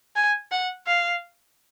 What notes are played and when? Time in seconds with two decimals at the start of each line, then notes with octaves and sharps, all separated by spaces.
0.16 G#5
0.51 F#5
0.87 F5